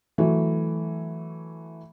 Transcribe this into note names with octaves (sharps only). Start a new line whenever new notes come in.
E3 F#3 A3